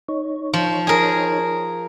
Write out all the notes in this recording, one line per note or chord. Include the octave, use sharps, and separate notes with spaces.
D#4 C#5
F3
G#4 A#4